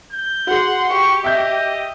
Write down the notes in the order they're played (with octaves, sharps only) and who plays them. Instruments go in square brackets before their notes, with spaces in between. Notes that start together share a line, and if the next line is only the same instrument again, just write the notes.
[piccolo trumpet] G6
[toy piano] F#4 G#4 [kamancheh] F#5 C6
[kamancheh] G4 [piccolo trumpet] C#6
[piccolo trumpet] D#5 [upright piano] E5 G6